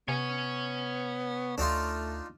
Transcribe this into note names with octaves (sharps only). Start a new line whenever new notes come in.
C3 B3 C#5 G#5
D2 A3 D4 D#4 F4